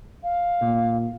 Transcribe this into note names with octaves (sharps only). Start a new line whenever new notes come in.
F5
A#2